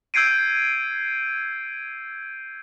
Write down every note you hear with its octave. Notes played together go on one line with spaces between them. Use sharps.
E6 G6 G#6 C7 D7 D#7